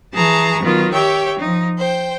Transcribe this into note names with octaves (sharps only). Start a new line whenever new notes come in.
E3 G#4 A5 A#5 C#6
D#3 F#3 B3 F4
G4 C#5 E5 G5
F3 D#4
C5 G5